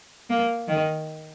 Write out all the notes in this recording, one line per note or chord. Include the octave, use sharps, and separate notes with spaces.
A#3
D#3